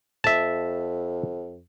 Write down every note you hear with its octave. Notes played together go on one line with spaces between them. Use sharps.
F2 E5 A5